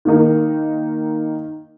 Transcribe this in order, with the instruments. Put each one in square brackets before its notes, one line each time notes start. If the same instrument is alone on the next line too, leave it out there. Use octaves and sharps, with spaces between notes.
[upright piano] D#3 A#3 D#4 A#4